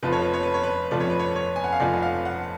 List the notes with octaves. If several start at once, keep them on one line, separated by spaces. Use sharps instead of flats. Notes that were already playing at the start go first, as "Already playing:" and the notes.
F1 F2 F3 A3 F4 B4
C#5
B4
C#5
B4
C#5
B4
F1 F2 F3 A3 F4 D5
C#5
B4
C#5
C#5
G#5
F#5
F5
F1 F2 F3 A3 F4 D5
F#5
F5
F#5